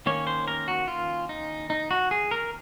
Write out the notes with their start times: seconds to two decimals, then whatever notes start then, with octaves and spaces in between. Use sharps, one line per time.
0.06 D#3 A#3 C#4 C#5
0.27 C5
0.48 A#4
0.68 F#4
0.88 F4
1.29 D#4
1.70 D#4
1.91 F#4
2.11 G#4
2.31 A#4